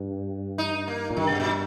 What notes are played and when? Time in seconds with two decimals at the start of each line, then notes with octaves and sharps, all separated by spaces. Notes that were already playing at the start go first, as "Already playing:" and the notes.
Already playing: G2
0.58 D#4
0.88 A#3
1.10 A#2
1.17 G2 D#3
1.29 C3
1.40 A#2